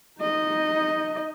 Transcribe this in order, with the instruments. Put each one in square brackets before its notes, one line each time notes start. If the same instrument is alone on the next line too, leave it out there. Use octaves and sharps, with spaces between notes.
[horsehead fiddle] D#4 D#5